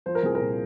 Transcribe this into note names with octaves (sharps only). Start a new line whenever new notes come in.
F3 C5
A#4
C2 G#4
A#4
A#2